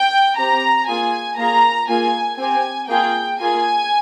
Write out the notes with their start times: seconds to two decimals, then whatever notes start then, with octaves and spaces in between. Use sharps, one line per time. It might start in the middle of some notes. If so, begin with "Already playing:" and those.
Already playing: G5
0.37 C4 G4 A#5
0.88 A#3 F4 G#4 G#5
1.38 A#3 F4 G#4 A#5
1.89 A#3 F4 G#4 G#5
2.38 C4 G4 G#5
2.89 A#3 F4 G#4 G5
3.39 A#3 F4 G#4 G#5